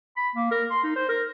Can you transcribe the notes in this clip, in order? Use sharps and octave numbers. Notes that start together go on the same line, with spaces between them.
B5
A#3
A#4
C6
D#4
C5
A#4